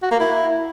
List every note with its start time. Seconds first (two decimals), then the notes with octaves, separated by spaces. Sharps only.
0.03 F#4
0.11 A#3
0.20 E4